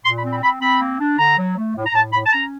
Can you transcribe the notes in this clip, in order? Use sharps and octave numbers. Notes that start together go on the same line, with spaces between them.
A#2 C6
B5
C4
B5
C4 B5
C4 B5
A#3
D4
D3 A#5
F#3
A3
A2
A#5
A2 A5
A2 B5
A5
C#4 A#5